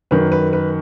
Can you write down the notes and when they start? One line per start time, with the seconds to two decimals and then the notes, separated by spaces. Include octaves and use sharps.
0.11 F#2 D#3 B4
0.32 B4
0.53 B4